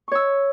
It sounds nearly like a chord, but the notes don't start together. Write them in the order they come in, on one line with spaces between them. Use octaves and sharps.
C#6 C#5 E6